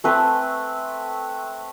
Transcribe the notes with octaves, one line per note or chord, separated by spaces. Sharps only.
A3 C4 B4